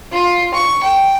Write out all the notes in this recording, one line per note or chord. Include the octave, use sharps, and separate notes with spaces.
F4
C#6
G5